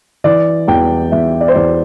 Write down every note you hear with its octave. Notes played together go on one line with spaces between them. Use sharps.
E3 D5
E2 G5
E2 E5
D5
C5
E2 D5